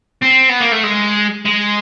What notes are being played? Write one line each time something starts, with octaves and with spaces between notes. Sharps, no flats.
C4
B3
A#3
A3
G#3
G#3